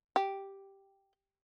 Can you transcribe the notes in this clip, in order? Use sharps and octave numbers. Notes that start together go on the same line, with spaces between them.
G4